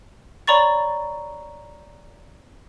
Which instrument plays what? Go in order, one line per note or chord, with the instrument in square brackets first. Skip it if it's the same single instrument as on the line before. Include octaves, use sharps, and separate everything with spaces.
[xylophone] C#5 D5 A#5 B5 C#6 A6